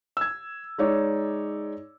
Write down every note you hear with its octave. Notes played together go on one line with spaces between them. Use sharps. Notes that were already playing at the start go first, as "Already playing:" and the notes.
E6 G#6
G#3 D#4 C#5 D5